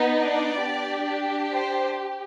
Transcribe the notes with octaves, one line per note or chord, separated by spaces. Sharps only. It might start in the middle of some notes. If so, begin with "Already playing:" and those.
Already playing: B3 D#4
D4 D5
D4 G4
C5